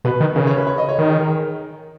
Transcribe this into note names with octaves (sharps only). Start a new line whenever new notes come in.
B2 B4
D#3
C#3 A#4
C#5
B4
C#5
D#5
C#5
D#3 A#4
G#4
A#4